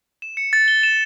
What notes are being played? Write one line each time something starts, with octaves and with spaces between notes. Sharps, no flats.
E7
C#7
A6
G7
E7